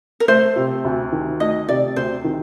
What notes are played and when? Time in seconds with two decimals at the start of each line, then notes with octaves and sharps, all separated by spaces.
0.20 A#4
0.28 A3 C5
0.56 C3
0.85 D2
1.12 D#3
1.40 A3 D#5
1.69 C3 D5
1.96 D2 C5
2.24 D#3